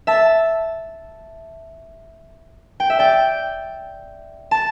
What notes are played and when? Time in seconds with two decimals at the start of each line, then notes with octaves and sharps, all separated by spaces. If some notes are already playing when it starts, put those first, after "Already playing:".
0.07 E5 A5
2.80 G5
2.90 E5
2.99 D5 G5
4.51 A5